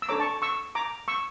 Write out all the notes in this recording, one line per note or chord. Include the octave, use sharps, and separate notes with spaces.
E6
D4 A4 C#5 A#5 D6
A5 C#6
C#6 E6
A#5 D6
C#6 E6